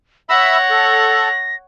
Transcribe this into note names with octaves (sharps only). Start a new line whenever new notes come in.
C#5 E5 F#5 B5 E6 A#6
A4